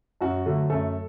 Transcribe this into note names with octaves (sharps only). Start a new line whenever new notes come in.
F#2 F#4
D3 F#3 A3
F#2 A3 A4